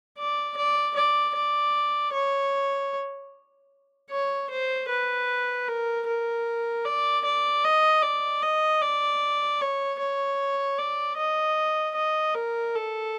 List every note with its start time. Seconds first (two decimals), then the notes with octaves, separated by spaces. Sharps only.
0.18 D5
0.57 D5
0.96 D5
1.36 D5
2.13 C#5
4.11 C#5
4.50 C5
4.89 B4
5.68 A#4
6.07 A#4
6.85 D5
7.25 D5
7.65 D#5
8.03 D5
8.42 D#5
8.82 D5
9.61 C#5
9.99 C#5
10.78 D5
11.17 D#5
11.96 D#5
12.35 A#4
12.75 A4